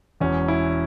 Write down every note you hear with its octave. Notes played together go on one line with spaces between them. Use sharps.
E1 E2 E3 C#4
E4